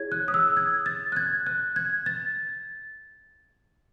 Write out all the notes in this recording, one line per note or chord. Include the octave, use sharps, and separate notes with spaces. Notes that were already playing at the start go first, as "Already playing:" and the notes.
Already playing: E4 G#4 C#5 G#6
F#6
D#6
E6
G#6
A6
F#6
G#6
F#6
G#6
A6